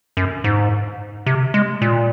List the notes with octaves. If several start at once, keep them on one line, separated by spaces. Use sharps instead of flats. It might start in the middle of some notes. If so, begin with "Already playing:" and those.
F#2
G#2
C3
G#3
A#2